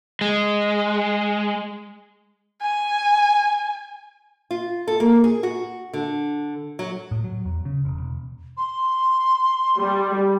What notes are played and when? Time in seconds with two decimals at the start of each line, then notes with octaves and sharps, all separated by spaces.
0.21 G#3
2.62 G#5
4.51 F4
4.88 A4
5.00 A#3
5.24 G#4
5.43 F#4
5.93 D3
6.79 F#3
7.11 A2
7.24 F#3
7.45 E2
7.65 C#3
7.85 E1
7.98 E1
8.56 C6
9.78 G3